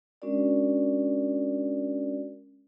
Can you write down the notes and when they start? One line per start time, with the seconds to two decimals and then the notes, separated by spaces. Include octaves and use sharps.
0.22 G#3 C#4 D4 F#4 A#4 D5